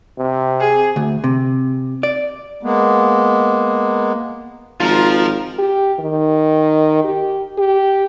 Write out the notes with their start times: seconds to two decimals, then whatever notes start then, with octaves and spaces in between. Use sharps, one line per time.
0.19 C3
0.60 G#4
0.96 D2
1.24 C3
2.03 D5
2.63 G#3 A#3 B3
4.80 G#1 F3 F4 A#4
5.59 G4
6.00 D#3
7.04 G4
7.58 G4